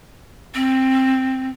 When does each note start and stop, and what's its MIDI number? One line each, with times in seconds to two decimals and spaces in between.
0.54 1.49 60